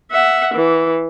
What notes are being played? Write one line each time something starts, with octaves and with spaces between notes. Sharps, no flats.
E5 F#5
E3